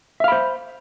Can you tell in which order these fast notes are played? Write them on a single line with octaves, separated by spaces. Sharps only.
E5 F5 B5 C5